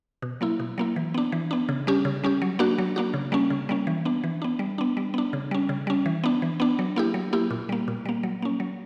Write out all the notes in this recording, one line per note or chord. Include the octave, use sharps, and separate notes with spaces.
B2
F#3 A#3 E4
B2
F#3 A#3 E4
E3
B3 D4
E3
B3 D4
C#3
G3 C#4 G4
C#3
G3 C#4 G4
F#3
A#3 D4 F#4
F#3
A#3 D4 F#4
C#3
G3 A#3 C#4
C#3
G3 A#3 C#4
E3
B3 D4
E3
B3 D4
G3
B3 D4
G3
B3 D4
C#3
G3 C#4
C#3
G3 C#4
E3
B3 D4
E3
B3 D4
F#3
A#3 E4 G4
F#3
A#3 E4 G4
A#2
G3 A#3
A#2
G3 A#3
F#3
A#3 C#4
F#3